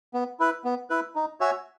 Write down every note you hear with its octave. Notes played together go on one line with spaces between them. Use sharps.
B3
E4 B4
B3
E4 B4
D#4
F#4 C#5 E5 G#5